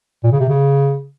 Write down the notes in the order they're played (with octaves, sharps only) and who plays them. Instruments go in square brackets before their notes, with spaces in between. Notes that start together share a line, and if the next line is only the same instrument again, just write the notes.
[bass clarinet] A#2
C#3
C3
C#3